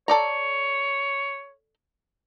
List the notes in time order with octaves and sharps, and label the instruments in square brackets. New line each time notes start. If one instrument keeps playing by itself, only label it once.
[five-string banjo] A4 D5 A#5 [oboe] C#5